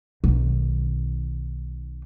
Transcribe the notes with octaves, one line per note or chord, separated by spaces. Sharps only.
B1 D#3